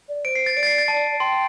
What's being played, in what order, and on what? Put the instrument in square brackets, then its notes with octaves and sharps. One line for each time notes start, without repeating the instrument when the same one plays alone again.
[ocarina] D5
[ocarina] C5 [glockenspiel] D7
[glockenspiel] C7
A6
[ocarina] D5 [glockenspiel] D7
[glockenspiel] A6
C7
A6
A5
[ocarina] G5 [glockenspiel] C6